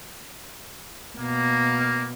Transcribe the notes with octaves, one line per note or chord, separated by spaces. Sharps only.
B2 A#3